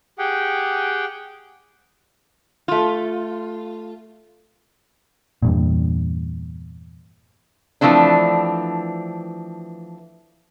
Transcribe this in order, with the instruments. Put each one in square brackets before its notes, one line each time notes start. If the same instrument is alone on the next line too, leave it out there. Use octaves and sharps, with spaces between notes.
[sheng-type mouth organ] G4 G#4 F#5 G5
[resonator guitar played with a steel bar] A3 F4
[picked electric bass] E2 G2 A#2
[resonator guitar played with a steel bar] E3 F3 A3 C4 D4